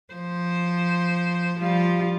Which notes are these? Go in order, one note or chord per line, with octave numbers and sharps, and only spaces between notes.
F3 C5
F3 G3 F4